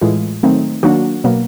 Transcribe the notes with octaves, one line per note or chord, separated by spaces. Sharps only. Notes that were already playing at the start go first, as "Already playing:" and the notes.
A2 E3 G#3 F4
D#3 F#3 A3 C4 D#4
D#3 F#3 A#3 D4 F#4
B2 F#3 A#3